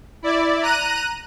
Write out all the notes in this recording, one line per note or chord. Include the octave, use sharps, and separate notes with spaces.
E4 D5
A#5 F#6 D#7